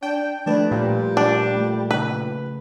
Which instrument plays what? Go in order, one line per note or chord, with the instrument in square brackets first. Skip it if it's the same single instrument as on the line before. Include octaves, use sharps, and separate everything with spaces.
[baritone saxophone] D4 [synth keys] G5
[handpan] F3 A3 B4 [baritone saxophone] D4
[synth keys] A#2 [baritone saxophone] G3
[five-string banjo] D4
[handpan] A3
[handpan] C#3 [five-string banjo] B4